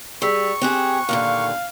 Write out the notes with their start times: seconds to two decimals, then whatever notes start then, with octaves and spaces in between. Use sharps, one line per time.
0.22 G3 G#4 C#6 E6 B6
0.61 C4 G4 G#4 G5 F#6
1.09 D#2 A#2 D3 F5